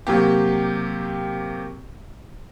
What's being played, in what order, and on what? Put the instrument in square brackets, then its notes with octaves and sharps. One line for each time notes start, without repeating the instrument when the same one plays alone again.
[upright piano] C3 F#3 A#3 G4